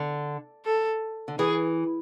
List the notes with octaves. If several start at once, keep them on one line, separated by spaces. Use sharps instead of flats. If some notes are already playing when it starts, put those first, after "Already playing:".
Already playing: D3
A4
D3
E3 G#4